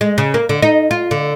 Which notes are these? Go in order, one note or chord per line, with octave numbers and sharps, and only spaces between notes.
G#3
C#3
A#3
D3
D#4
F4
D3